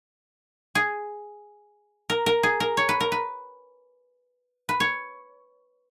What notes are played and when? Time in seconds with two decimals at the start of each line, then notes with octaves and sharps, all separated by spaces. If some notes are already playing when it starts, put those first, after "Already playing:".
0.75 G#4
2.10 A#4
2.26 A#4
2.43 G#4
2.60 A#4
2.77 C#5
2.89 B4
3.00 A#4
3.12 B4
4.69 B4
4.80 C#5